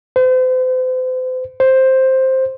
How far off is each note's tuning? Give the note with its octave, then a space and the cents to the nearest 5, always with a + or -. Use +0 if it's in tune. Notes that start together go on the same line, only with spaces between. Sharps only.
C5 -40
C5 +5